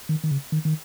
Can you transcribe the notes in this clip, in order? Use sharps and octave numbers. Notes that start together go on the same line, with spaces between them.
D#3
D#3
C#3
D#3
D#3